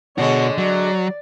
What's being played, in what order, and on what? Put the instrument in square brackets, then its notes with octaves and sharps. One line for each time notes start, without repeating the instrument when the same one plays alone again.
[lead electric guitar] B2 F#4 [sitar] D3 G#3 [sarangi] C#5
[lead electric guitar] F#3 [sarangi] D5